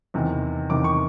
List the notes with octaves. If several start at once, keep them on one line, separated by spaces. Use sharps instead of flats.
E2 C3 D#3
E2 C3 D#3 D6
C#6